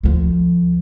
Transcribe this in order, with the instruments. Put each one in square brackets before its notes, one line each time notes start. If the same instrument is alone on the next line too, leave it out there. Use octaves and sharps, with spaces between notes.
[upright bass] D2 F3